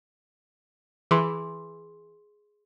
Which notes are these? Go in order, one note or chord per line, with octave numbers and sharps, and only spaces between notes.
E3 G#4 C6